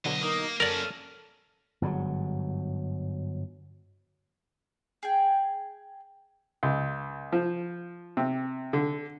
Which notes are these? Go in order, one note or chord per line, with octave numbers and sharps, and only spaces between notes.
E2 B2 D3 F#3 D#5
A#3 D#4 A#4 D#6
F#2 A#3 C#4 A4 A#4 D5 A5 F6
G1 G#2 C#3 F#3
G#4 G5
C#2
F3
C3
D3